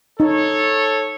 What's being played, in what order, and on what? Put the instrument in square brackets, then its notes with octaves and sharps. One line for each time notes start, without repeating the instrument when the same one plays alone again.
[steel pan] D#4 [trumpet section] A4 C#5